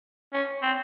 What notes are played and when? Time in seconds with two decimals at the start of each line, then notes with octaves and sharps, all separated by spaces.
0.33 C#4
0.62 C4